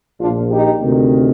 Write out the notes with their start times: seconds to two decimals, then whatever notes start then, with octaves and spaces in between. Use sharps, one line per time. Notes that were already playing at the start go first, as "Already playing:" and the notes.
0.19 A#1 A#2 D4 F4
0.51 D#4 G4
0.82 D2 C3 D#3